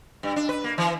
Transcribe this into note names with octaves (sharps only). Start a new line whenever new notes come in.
G2
D4
B4
A#3
E3